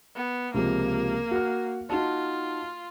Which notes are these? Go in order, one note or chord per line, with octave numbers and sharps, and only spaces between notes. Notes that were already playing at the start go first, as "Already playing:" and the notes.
B3
C#2 C3 F3 A#3
F#4 F6
D#4 F4 F#4 A5